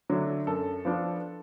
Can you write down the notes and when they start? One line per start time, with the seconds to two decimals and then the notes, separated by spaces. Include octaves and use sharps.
0.10 D3 F#3 A3 D4
0.47 F#2 A4
0.85 F3 B3 D4